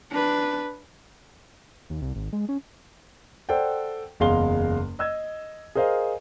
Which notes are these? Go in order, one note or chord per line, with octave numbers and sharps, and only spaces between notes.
D4 B4
D#2
C2
G#1
G#3
C#4
A4 C5 D5 F#5 G5
F#1 E2 G#3 F5 C6 G7
D#5 E6 G#6
G#4 A#4 C5 D#5 F5